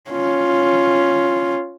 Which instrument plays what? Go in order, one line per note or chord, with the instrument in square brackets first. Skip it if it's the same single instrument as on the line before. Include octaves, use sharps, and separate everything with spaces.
[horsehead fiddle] C#4 F4